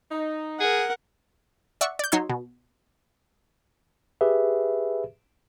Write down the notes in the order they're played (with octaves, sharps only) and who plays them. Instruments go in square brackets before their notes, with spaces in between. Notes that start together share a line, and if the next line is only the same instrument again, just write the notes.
[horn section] D#4
[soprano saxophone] G#4 [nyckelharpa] A#4 F#5
[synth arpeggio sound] D5 E5 F#5 C#6
D5 G6
F#3 D#4 C#5 C6 E6
B2
[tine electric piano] G4 G#4 B4 E5